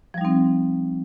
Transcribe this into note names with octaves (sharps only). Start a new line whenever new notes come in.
F3 G3 C4 D#4